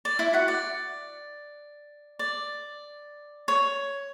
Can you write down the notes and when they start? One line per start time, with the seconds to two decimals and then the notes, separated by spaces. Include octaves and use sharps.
0.05 D5
0.19 E4 E5
0.33 F#4 F#5
0.48 D5
2.19 D5
3.48 C#5